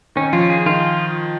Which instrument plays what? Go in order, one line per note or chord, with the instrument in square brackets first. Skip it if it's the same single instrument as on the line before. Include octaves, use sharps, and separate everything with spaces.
[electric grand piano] D#3 [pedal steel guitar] C#4
[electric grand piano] F3 [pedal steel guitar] F4
[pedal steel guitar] G#4
[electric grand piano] D#3 [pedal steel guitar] F4